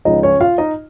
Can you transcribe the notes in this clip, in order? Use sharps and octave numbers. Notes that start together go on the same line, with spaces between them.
C#2 C#3 F3 D#4 D#5
C#4 C#5
F4 F5
D#4 D#5